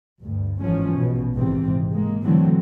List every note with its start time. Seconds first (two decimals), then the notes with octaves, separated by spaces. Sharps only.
0.21 D2 G2
0.61 G1 G#2 E3 F3 C#4
0.95 A#1 B2
1.35 G#1 G#2 C3 E3 C4
1.92 G#3 A#3
2.23 D3 E3 F#3 A3 C4